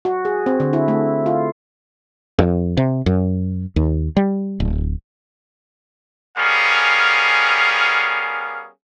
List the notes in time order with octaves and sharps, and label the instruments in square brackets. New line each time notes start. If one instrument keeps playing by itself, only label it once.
[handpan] F#4
G#4
C4
D3
E4
A3
F4
[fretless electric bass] F2
C3
F#2
D#2
G3
D1
[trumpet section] G3 B3 C#4 G#4 A#4 F5